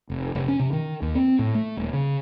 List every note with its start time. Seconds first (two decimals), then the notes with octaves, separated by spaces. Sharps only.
0.10 F1
0.35 F1
0.48 C#4
0.59 C3
0.73 D#3
1.02 D#2
1.15 C4
1.39 A2
1.55 A3
1.77 D#1
1.93 C#3